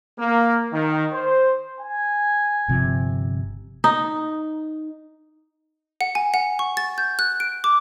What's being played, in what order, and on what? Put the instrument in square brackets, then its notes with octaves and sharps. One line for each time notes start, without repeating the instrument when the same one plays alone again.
[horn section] A#3
D#3
C5
[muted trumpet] G#5
[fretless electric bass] G1 C3 F3
[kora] D#4
[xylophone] F#5
G#5
F#5
C#6
A6
G6
F#6
D7
D6